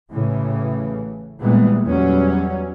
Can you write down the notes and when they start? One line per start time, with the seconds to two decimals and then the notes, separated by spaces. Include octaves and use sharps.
0.11 A1 A2 C#3 E3
1.41 A#2 E3 G3 G#3 B3
1.84 E2 F#3 G3 B3 C#4